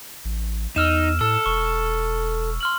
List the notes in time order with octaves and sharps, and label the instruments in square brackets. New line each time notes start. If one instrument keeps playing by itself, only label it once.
[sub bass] A1
[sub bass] E2 [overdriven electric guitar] D#4 [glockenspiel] E6 F6 E7
[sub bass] A2 [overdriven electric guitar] A4 [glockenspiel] E6
[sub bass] E1 [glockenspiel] C#6
[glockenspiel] C6 F6 F#7